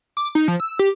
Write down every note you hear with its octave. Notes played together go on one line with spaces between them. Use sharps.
D6
D#4
F3
E6
G4